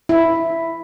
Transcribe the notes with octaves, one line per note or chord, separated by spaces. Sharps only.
E4